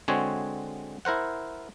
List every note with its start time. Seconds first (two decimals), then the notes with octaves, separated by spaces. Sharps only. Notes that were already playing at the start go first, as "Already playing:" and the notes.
0.08 D3 G#3 C4 F#4 G#4 C#5
1.05 E4 A#4 C5 F#5